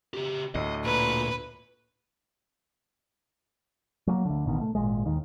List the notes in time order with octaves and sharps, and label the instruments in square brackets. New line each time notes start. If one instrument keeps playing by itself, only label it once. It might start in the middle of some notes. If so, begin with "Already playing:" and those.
[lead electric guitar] C#3 G4
[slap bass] D2 A2 [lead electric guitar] D#5
[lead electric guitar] A#2 [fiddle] B4
[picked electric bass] F#3 G3 A#3
D2 D3
A1 B2 D#3
A3
G#1 F2 A#2 G#3
D#2 D#3